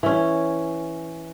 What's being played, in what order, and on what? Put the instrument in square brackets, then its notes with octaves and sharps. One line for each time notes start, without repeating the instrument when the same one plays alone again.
[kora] E3 C#4